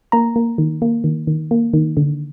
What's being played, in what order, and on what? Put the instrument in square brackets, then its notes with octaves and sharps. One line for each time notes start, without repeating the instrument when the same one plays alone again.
[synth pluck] A#3 A#5
A#3
D#3
A#3
D#3
D#3
A#3
D#3
D3